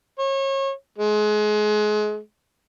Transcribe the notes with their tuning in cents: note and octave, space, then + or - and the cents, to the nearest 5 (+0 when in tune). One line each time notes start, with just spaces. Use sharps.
C#5 -30
G#3 +30